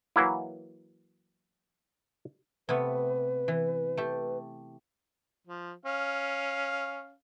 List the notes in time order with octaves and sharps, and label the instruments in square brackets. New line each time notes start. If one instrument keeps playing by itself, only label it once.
[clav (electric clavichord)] E3 F#3 A#3 E4
[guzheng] C3 A3 B3 [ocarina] B4
[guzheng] E3
A3 G4
[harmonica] F3
C#4 F5